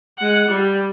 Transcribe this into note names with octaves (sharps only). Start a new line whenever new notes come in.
G#3 F#5
G3